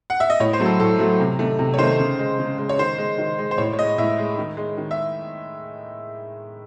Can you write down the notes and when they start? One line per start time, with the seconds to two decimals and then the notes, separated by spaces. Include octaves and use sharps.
0.10 F#5
0.20 E5
0.30 D#5
0.40 A2 C#5
0.53 C5
0.60 F#3 A3
0.66 A4
0.79 A2 A4
0.99 F#3 A3
1.20 C3
1.39 D#3 A3
1.59 C3
1.74 C#5
1.78 D#3 A3 C5
2.00 C#3
2.19 G#3
2.39 C#3
2.58 G#3
2.69 C#5
2.79 D#3 C5
2.98 G#3
3.18 D#3
3.39 G#3
3.51 C5
3.58 A2 C#5
3.73 C#5
3.79 G#3 D#5
3.98 A2 E5
4.18 G#3
4.38 D#3
4.57 G#3
4.78 D#3
4.91 E5